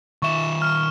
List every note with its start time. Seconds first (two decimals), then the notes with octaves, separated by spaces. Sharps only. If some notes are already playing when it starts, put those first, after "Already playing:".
0.22 D#3 E5 C#6 E7
0.62 F6